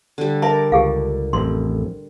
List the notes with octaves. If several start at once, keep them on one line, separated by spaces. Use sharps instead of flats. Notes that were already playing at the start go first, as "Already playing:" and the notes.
D3 G3
A#4 D5 E5 A5
C#2 G4 G#4 F5
A1 F2 C6